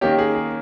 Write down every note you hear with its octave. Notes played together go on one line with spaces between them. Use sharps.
D#3 A#3 C#4 G4
G#4
G#4